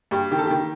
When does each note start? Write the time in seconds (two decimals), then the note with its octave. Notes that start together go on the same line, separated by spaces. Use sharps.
0.11 G2 G4
0.31 D#3 G4
0.38 A4
0.46 D#3 G4